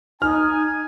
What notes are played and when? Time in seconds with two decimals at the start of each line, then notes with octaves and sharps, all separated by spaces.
0.22 D#4 G#5 F6